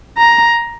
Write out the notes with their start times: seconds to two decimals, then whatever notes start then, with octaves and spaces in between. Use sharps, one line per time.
0.17 A#5